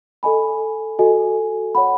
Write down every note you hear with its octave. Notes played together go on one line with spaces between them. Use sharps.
A4 D#5 G#5 B5
F#4 A4 D#5 G#5
C#5 F#5 B5